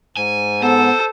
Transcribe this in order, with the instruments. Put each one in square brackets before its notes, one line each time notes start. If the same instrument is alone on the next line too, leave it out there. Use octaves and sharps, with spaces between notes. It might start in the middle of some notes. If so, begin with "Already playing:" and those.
[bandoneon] G#2 [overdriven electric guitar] G#5
[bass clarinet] B3 [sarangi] A4 [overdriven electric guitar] C5